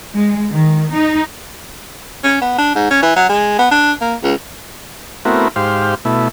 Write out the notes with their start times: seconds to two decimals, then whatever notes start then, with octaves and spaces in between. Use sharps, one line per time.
0.15 G#3
0.49 D#3
0.94 D#4
2.23 C#4
2.41 B3
2.58 D4
2.75 G#2
2.90 C#4
3.02 E3
3.16 F#3
3.29 G#3
3.58 B3
3.71 D4
4.01 A#3
4.23 C#2
5.25 A3 B3 C4 E4 F#4 A#4
5.56 G#2 G4 C5 F5
6.05 B2 A3 E4